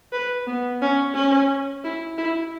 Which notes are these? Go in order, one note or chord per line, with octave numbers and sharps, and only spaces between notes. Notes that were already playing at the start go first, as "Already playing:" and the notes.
B4
B3
C#4
C#4
E4
E4